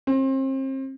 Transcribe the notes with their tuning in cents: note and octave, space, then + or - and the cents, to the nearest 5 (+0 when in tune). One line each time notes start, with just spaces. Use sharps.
C4 +35